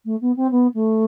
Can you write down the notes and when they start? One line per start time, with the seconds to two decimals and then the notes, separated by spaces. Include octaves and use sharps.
0.05 A3
0.21 B3
0.36 C4
0.51 B3
0.74 A3